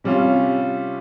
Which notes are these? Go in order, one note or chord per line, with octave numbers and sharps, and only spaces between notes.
C3 G3 C#4 F4